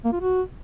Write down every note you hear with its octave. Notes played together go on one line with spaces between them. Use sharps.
A#3
F4
F#4